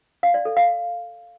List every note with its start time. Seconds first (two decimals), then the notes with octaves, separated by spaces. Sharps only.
0.23 F5
0.34 D5
0.45 A4
0.57 F5